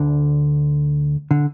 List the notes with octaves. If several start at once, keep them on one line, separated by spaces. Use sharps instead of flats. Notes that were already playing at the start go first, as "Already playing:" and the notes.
Already playing: D2 D3
D3